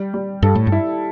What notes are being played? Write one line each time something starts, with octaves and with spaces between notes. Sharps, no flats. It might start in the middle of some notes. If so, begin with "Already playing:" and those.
Already playing: G3
G3
G2 A4
A2
G2
E4